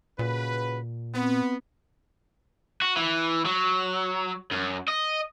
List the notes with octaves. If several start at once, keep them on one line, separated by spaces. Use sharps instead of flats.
A#2 C#3 F#4 B4
B3 C4
F#4
E3
F#3
F#2
D#5